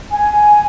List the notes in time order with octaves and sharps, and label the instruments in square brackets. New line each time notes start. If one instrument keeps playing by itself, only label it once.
[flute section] G#5